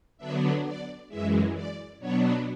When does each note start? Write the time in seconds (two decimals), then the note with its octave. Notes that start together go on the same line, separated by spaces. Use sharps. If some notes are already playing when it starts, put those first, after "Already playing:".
0.17 D3 F#3 B3 D4 E5
0.64 D5
1.08 F#2 E3 G#3 E5
1.53 D5
1.99 B2 F#3 B3 D4 C#5